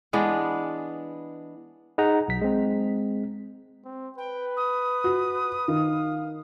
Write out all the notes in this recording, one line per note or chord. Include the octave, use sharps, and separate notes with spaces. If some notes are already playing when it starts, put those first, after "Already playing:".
E3 G#3 B3 D4
D#4 G#4 F#5 A#5
B1 B6
G#3 C4
C4
B4 G5
D#6
F#4
D#3 F5